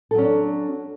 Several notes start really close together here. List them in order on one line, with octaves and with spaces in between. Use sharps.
A4 F#3 C#4 D4